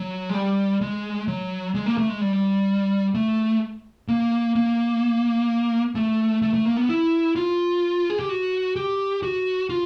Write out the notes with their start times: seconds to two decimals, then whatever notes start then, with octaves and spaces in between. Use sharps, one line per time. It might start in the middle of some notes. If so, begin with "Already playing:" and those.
Already playing: F#3
0.29 G#3
0.34 G3
0.81 G#3
1.28 F#3
1.75 G#3
1.86 A#3
1.98 A3
2.09 G#3
2.21 G3
3.15 A3
4.08 A#3
4.55 A#3
5.95 A3
6.42 A3
6.54 A3
6.65 A#3
6.77 B3
6.89 E4
7.36 F4
8.10 G#4
8.19 G4
8.29 F#4
8.76 G4
9.22 F#4
9.69 F4